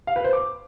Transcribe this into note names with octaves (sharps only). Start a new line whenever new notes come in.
F5
B4
C5
D6